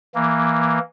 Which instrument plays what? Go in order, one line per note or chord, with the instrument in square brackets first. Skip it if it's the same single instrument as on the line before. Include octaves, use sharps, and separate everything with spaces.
[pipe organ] E3 A#3